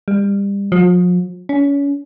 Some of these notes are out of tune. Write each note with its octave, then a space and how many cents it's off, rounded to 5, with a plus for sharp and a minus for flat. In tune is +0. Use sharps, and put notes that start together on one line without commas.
G3 +30
F3 +40
C#4 +30